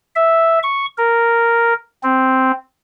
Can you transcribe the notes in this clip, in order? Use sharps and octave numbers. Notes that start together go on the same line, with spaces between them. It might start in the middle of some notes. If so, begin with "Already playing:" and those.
E5
C#6
A#4
C4